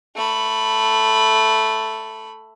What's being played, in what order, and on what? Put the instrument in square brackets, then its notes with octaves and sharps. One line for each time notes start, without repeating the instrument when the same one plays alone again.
[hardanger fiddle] A3 B5